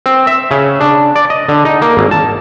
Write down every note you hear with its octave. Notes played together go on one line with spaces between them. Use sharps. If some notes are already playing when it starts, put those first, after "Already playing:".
C4
E5
C#3
D4
D5
D#5
D3
D#4
A#3
G#1
A5